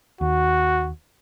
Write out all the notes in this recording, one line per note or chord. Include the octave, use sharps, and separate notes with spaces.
D#2 F#4